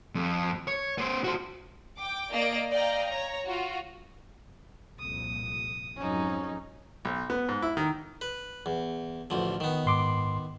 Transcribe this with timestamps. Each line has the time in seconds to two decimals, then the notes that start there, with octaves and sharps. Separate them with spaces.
0.15 F2
0.67 C#5
0.98 B3 C5
1.24 F#4 C5
1.99 G5 D6
2.32 A#3 D5 D#5 D7
2.70 D5 D#5 F5 G5 A#5
3.09 C#5 A#5
3.45 F4 F#4
4.99 C2 F2 A#2 D#6
5.97 F2 G#2 F#3 C#4 D#4
7.05 B1
7.30 B3
7.49 G#2
7.62 E4
7.77 D#3
8.21 B4
8.66 E2
9.30 A1 D2 F3
9.60 D#3 B3
9.86 G#2 C6 D6